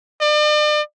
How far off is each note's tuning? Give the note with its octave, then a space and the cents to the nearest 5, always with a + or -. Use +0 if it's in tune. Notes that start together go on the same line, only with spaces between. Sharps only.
D5 +40